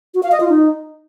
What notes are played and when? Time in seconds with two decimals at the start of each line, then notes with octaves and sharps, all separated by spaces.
0.14 F#4
0.23 F5
0.32 D#5
0.40 F4
0.49 D#4